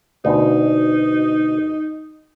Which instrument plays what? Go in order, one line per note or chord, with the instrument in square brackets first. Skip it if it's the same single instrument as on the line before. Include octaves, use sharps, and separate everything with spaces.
[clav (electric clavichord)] D2 B2 [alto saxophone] D#4